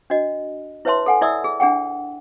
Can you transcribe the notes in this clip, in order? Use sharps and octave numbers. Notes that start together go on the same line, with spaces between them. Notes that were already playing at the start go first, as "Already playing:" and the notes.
D4 F#4 D#5
E4 B4 C#5 E5 A5 C6
A4 F#5 G#5
E4 D5 E5 D#6 E6
G#4
D4 G#4 F#5 G5